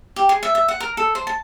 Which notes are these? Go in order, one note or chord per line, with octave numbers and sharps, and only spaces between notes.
G4
G#4
E5
E5
F#5
A#4
A4
C5
A5